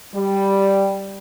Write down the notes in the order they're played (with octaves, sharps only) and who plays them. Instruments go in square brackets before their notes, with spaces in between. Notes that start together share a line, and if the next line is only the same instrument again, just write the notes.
[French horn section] G3